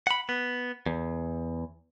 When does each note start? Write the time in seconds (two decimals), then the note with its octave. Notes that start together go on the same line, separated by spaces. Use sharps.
0.07 F#5 B5
0.29 B3
0.86 E2